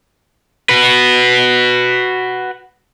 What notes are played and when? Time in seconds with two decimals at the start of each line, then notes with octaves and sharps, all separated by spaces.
0.69 F#4 B4